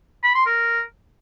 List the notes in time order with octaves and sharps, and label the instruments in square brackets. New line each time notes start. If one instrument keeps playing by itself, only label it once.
[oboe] B5
C6
A#4